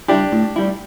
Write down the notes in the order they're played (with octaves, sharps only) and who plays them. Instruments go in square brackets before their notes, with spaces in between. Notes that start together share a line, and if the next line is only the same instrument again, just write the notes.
[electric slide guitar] G3 E4 [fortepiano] D4 G4
[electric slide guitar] A2
G3 E4